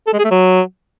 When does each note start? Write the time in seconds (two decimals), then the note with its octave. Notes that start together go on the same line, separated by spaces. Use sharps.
0.07 A4
0.13 G#3
0.19 G#4
0.25 A3
0.31 F#3